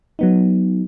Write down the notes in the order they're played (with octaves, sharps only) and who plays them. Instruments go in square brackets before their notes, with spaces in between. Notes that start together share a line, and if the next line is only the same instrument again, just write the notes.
[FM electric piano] F#3 B3 D#4